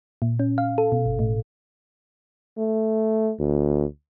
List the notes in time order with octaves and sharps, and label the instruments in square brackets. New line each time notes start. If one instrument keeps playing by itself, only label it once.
[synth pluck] A#2
C#4
F5
A4
B2
G1
A2
[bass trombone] A3
D2